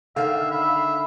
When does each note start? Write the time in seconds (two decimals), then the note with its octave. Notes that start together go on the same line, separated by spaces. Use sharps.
0.16 D3 D#3 E5 F5
0.52 E5 B5